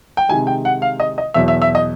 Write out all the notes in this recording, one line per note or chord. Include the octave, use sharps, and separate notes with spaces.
G5
C3 D#3 G#3 G#5
G5
F#5
F5
D#5
D#5
E2 B2 F#3 E5
E5
E5
D#5